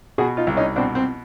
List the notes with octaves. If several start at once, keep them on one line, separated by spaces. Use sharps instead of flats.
B2 F#4 G#4
D#4 F4
C2
C#4 D#4
B2 C4 D4
C4